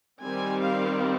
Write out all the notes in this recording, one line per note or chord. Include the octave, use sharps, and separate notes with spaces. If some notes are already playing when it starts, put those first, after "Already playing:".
D#3 G3 C4 G#5
F5